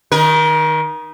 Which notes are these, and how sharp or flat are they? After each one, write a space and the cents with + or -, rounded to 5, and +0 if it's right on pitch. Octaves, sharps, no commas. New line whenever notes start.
D#3 -10 A#4 +35